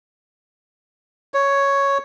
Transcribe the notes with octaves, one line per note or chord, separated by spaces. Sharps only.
C#5